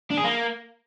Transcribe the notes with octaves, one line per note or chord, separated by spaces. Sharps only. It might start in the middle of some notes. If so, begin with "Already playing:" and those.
D4
G#4
A#3